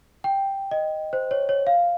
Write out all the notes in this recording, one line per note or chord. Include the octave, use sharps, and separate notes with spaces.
G5
D#5
C5
C#5
C#5
F5